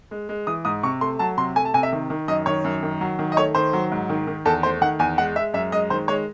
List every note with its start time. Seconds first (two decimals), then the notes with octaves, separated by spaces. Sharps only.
0.11 G#3
0.29 G#3
0.47 E3 D#6
0.65 G#2 D#6
0.83 C3 C#6
1.01 A3 C6
1.19 F#3 A5
1.37 C3 C6
1.56 A3 G#5
1.65 A5
1.74 C3 G#5
1.83 E5
1.92 D#3
2.10 D#3
2.28 F#2 D#5
2.46 D#3 C#5
2.64 F#2
2.83 D#3
3.01 F#3
3.19 D#3
3.32 D#5
3.37 A3 C#5
3.55 D#3 C5
3.73 F#3
3.92 G#2
4.09 D#3
4.27 D#3
4.45 E2 A4
4.63 A3 C5
4.81 D#3 F#5
4.99 E2 G#5
5.18 G#3 F#5
5.36 G#3 E5
5.54 F#2 E5
5.72 G#3 D#5
5.90 D#3 C5
6.08 G#3 C#5